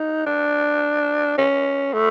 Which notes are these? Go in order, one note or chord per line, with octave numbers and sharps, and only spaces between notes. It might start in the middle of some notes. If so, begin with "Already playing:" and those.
Already playing: D#4
D4
C#4
A3